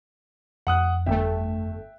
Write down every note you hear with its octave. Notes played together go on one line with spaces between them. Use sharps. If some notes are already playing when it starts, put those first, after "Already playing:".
F2 F#5 D#6 F#6
G1 A3 E5 G5